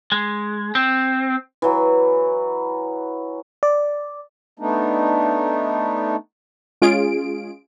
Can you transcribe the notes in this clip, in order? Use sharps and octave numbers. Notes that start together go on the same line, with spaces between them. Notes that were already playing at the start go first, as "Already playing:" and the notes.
G#3
C4
E3 F#3
D5
A3 B3 D4 D#4
G#3 C#4 F4 G#4 D7